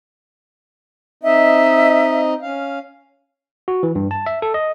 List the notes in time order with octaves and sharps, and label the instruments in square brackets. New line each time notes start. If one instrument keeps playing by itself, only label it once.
[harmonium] C4 D#4 D#5 [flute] E5
[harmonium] C#4 F5
[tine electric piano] F#4
E3
G2
A5
E5
A4
D#5